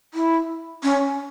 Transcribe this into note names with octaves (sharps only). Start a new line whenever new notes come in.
E4
C#4